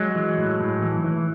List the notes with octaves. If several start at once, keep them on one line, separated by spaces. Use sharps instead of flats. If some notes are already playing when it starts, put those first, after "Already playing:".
Already playing: F#3 G#3
E3
A2
A2
E3
E3